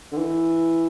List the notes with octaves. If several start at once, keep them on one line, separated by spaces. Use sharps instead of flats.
D3
E3